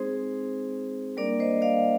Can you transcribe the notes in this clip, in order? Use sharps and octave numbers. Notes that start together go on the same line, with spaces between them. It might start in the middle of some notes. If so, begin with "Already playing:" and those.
Already playing: G#3 C4 D#4 G#4 C5
G3 A#3 D4 A#4 D5
C5 D#5
D5 F5